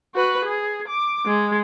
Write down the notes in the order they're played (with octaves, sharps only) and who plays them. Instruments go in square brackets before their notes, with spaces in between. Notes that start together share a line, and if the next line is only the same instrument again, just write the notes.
[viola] F#4 B4
G#4
D6
G#3